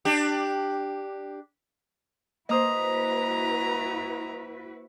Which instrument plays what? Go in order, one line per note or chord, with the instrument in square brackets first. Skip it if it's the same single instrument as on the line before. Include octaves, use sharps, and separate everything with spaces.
[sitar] D4 G4
[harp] A#3 C5 [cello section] E4 F#4 B4 [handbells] D#5 D#6 [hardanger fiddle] A#5